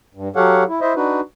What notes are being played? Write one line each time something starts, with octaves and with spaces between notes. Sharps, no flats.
G2
F#3 G4 A4 C#5 F5 F#5
E4
E4 C5 D#5 E5
D4 D#4 F#4 B4